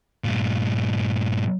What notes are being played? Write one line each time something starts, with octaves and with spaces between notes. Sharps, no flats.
G2 A#2